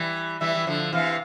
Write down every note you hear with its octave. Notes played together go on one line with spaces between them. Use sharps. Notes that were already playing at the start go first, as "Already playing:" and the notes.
Already playing: E3 G3
E3 G3 E5
E3
D3 F3
C3 E3 F5